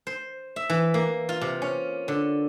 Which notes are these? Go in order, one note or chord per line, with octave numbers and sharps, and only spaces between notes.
C5
E5
E3
A#3
F4
C3
C#4
D3